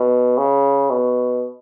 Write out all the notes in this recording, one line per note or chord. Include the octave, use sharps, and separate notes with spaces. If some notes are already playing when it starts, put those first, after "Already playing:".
Already playing: B2
C#3
B2